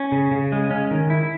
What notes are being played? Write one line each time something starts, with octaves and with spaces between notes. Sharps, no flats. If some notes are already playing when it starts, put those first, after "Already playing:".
Already playing: C#4
C#3
C#3
G#3
C#4
D#3
E4